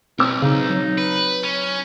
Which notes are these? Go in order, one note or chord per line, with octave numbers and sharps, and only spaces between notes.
B1 C4 E6
C#3 D#4
F#3
B4
C#4